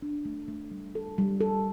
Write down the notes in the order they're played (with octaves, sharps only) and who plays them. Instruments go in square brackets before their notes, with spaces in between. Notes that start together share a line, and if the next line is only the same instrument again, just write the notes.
[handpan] D4
A3
A3
G3
A4
G3
A4